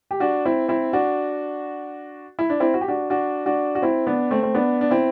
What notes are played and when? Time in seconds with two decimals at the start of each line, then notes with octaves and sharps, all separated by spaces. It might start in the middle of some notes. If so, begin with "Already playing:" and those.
0.11 G4
0.20 D4 F#4
0.45 C4 E4
0.68 C4 E4
0.93 D4 F#4
2.39 E4
2.50 D4
2.60 C4 E4
2.74 F#4
2.81 G4
2.88 D4 F#4
3.10 D4 F#4
3.46 D4 F#4
3.75 F#4
3.82 C4 E4
4.07 B3 D4
4.31 A3 C4
4.43 C4
4.55 B3 D4
4.81 D4
4.91 C4 E4